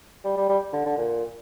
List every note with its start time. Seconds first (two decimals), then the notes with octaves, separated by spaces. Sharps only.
0.24 G3
0.37 G3
0.49 G3
0.73 D3
0.86 D3
0.98 A#2